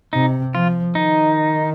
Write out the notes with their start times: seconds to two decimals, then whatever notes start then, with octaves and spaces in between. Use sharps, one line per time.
0.13 C3 D#4
0.54 F3 F4
0.95 D#3 D#4